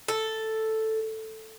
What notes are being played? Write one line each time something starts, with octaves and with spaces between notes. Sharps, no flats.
A4